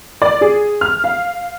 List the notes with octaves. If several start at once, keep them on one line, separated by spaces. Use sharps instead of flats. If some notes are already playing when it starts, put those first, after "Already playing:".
D5
G#4
F6
F5